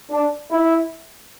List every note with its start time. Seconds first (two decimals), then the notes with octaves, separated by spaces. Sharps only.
0.10 D4
0.51 E4